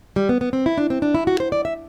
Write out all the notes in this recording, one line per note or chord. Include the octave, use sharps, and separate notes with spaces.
G3
B3
B3
C4
E4
D4
C4
D4
E4
F#4
C5
D5
E5